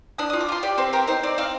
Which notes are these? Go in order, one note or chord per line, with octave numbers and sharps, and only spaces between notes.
D4 D#6
D#6
F4
D6
F4 C6
G4 D5
C4 C5
G4 A#4
D#4 C5
C4 D5
C4 F5